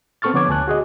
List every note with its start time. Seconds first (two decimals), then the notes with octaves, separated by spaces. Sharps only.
0.22 B3 C4 A4 C#6 F6 A6
0.34 D3 F3 B3 C#5 D6 G#6
0.49 D2 G#5 A5 F#6
0.68 F#4 G#4 D#5